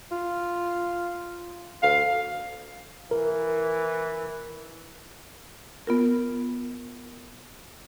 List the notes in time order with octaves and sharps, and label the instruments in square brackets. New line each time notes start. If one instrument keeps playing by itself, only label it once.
[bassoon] F4
[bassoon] D2 [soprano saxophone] F5
[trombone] E3 [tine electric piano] A#4
[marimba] B3 F4 A#4